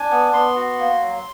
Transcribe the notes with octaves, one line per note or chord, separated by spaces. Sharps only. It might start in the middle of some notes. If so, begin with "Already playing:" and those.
Already playing: D4 G#5
B3
B3 C6
F#4
A#3
F#3